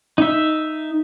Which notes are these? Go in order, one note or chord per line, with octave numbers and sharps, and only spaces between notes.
D#4 E5